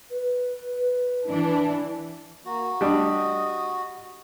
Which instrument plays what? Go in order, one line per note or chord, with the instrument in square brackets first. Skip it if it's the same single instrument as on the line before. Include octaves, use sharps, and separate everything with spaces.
[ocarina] B4
[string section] E3 D4
[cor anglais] A#3 [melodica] F#4
[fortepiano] G3 D4 [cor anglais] D#5